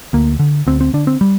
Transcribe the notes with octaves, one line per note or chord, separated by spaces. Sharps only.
D2 A#3
D3
D2 C4
C4
D3 D4
C4
G3